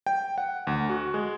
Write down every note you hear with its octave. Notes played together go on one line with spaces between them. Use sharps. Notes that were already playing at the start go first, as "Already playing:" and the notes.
G5
F#5
D2
F#4
G#3